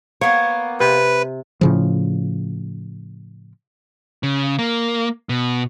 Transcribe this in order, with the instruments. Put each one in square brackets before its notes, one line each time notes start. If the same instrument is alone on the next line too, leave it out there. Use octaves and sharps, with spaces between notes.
[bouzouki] A#3 B3 [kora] C#5
[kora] C3 [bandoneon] B4
[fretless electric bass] A2 C#3 F3
[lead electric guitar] C#3
A#3
B2